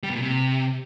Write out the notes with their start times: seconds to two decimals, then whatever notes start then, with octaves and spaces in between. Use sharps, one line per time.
0.03 G3
0.10 B2
0.16 A#2
0.22 C3